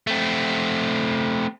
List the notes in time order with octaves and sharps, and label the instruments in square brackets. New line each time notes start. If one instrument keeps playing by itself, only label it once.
[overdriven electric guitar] A3 C4